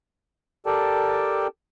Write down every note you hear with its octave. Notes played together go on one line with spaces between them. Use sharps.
G4 A4 A#4 D5 G5 A5